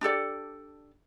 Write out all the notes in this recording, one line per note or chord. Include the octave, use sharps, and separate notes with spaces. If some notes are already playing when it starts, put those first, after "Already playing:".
D4 G4 A4 D5